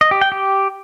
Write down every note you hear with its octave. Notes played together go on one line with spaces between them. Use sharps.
D#5
G4
G5
G4